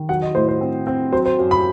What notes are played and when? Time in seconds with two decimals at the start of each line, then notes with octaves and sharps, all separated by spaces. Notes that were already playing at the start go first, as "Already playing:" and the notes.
Already playing: D#3
0.09 F#3 F#5
0.22 D#5
0.35 A2 C5
0.49 C5
0.61 C4
0.87 C4
1.12 F#3 C5
1.26 C5
1.39 F#2
1.51 B5